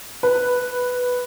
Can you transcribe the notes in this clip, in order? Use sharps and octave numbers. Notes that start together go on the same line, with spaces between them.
B4